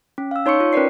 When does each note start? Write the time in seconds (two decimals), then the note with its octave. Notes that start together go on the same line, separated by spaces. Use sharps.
0.18 C#4
0.31 F5 E6
0.46 D#4 C#5 C6 C#6 C#7
0.60 F4
0.73 C#4 A#4 B4 D5 C7